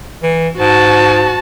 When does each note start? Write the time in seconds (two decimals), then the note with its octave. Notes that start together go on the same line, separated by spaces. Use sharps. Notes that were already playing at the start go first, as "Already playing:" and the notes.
0.23 E3
0.58 G#2 F#4 A5